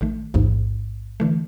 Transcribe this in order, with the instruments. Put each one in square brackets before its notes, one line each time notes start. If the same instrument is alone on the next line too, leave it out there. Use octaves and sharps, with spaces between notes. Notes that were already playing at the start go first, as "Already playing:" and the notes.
[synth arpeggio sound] A#1 D#3 A3
[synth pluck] A1 D#2 G#2
[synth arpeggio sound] D3 E3 A3